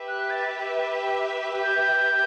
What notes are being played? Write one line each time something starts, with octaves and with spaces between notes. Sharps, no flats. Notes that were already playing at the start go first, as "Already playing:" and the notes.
Already playing: G4 B4 E5
F#6
A6
G6